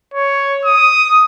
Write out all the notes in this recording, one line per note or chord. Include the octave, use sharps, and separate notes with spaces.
C#5
D#6